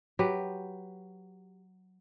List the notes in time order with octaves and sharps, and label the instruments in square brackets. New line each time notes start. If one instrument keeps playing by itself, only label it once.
[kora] F#3 G4 B4